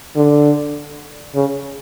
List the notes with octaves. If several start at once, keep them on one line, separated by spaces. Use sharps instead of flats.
D3
C#3